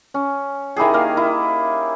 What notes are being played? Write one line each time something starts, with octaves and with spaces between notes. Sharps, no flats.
C#4
D#3 E4 G4 G#4
A#3 F5
E4